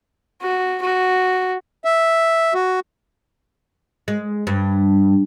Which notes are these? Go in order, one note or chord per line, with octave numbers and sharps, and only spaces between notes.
F#4
F#4
E5
F#4
G#3
G2